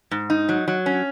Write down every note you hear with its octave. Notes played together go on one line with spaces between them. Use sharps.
G#2
D#4
F#3
F#3
C#4